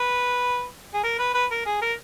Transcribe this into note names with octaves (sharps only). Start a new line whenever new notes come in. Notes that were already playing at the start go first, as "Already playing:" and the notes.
Already playing: B4
G#4
A#4
B4
B4
A#4
G#4
A#4